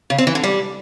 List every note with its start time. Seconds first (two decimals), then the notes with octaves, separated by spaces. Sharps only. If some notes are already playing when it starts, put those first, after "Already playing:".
0.10 C#3
0.18 C4
0.27 E3
0.35 D3
0.44 G3